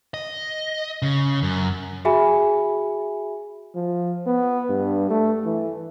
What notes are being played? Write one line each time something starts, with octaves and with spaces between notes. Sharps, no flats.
D#5
C#3
F#2
F#4 G#4 E5 G#5 B5
F3
B3
G2
A3
E3